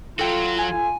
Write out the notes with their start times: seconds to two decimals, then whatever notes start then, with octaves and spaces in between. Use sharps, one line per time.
0.19 F#3 F4 F#4 A4 G5
0.58 G#5